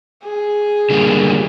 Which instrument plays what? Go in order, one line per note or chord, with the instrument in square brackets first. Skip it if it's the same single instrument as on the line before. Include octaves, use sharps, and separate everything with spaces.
[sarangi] G#4
[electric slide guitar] D3 G3 A#3